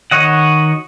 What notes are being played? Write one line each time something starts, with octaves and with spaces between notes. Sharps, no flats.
D#3 F#4 C#5 D#5 F#5